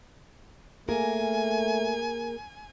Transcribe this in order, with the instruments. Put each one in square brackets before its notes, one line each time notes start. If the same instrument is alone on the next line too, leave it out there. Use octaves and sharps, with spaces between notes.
[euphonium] A3 [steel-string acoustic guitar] A#3 G#4 A#4 [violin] G#5